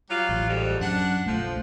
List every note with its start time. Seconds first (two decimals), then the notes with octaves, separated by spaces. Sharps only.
0.09 F#3 G3 F4
0.29 A1
0.47 F2 G#2 G3
0.81 F#2 D4 F#5
1.26 B1 F3 A3